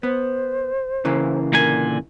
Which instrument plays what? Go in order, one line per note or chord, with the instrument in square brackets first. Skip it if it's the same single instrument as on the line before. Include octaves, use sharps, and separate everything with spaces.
[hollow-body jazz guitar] B3 [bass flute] C5
[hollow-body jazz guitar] C#3 E3 A#3
[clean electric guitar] A#2 D3 G#5 [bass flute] A#4